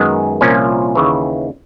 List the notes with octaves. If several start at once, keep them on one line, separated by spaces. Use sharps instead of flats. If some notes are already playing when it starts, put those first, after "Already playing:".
Already playing: F#2 D#3 G#3 B3
C2 A#2 F3 A#3 C#4
D#2 C#3 E3